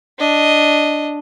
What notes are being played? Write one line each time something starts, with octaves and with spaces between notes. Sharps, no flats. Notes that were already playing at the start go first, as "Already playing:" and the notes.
D4 D#5